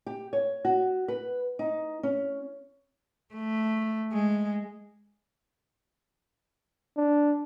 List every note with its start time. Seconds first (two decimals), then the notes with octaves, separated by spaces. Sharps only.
0.06 G4
0.33 C#5
0.65 F#4
1.08 B4
1.59 D#4
2.03 C#4
3.34 A3
4.13 G#3
6.97 D4